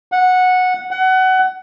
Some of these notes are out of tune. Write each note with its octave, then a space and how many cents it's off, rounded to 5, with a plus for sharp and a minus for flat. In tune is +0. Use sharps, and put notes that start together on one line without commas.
F#5 -10
F#5 +25